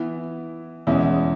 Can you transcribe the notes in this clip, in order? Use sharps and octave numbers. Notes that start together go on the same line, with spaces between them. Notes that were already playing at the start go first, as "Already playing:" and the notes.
Already playing: E3 B3 E4
E2 B2 G#3 C#4 E4